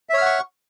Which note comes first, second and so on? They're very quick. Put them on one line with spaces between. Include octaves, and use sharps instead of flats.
E5 C#5 F6 F#5 C#6